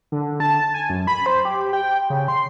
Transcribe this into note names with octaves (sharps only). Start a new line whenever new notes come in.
D3
A5
G#5
F#2
B5
C5
G4
G5
C#3
C6